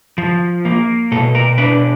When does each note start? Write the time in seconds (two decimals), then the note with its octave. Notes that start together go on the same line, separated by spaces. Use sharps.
0.18 F3
0.65 A#3
1.12 B2 A4
1.35 A#4
1.58 D4 B4